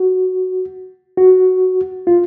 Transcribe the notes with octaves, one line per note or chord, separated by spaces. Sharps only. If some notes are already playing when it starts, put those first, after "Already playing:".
Already playing: F#4
F#4
F4